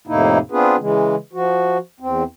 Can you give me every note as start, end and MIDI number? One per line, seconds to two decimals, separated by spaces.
0.07 0.38 41
0.07 0.38 45
0.07 0.38 48
0.07 0.38 58
0.07 0.38 63
0.07 0.38 64
0.51 0.76 59
0.51 0.76 60
0.51 0.76 62
0.51 0.76 65
0.51 0.76 68
0.51 0.76 71
0.79 1.16 49
0.79 1.16 52
0.79 1.16 56
1.33 1.77 53
1.33 1.77 66
2.00 2.23 40
2.00 2.23 60